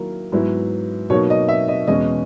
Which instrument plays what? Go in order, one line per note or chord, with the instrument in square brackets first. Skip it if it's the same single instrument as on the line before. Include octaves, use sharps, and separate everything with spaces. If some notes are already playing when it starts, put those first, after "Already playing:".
Already playing: [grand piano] D#3 F#3 A#3 E4 A#4
G#2 F#3 B3 E4
B2 F#3 A#3 D#4 C#5
D#5
E5
D#5
E2 B2 G#3 C#4 D#5